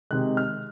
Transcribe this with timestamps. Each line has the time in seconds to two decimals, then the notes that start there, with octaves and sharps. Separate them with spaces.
0.11 C3 D#3 G#3 F#6
0.37 F6